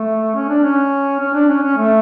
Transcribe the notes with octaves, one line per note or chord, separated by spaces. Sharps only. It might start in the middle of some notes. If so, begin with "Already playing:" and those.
Already playing: A3
C#4
D4
C#4
C#4
D4
C#4
C#4
A3